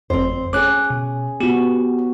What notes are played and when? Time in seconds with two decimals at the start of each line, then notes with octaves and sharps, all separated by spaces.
0.10 G1 F2 C4 C5
0.53 C#4 G#4 D6 F#6
0.90 B2
1.41 B3 F#4 G4